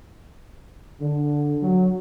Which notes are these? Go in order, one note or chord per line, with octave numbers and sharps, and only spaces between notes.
D3
F#3